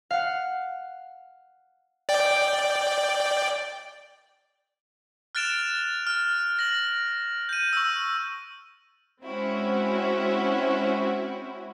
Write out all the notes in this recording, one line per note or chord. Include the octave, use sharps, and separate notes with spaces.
F5 F#5
D5 G5
F6 F#6 A6 D7 E7 F7
F6
A#6 F#7
G6 D#7
C#6 E6
G#3 C4 C#4 E4 F#4